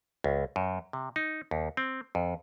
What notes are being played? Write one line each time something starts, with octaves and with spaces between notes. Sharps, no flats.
C#2
F#2
C3
D#4
D#2
C4
F2